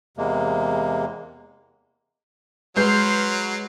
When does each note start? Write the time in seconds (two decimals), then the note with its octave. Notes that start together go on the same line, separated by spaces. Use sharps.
0.17 E2 C3 G#3 A#3
2.76 F#3 G#3 B4 C6 F6 G6 C7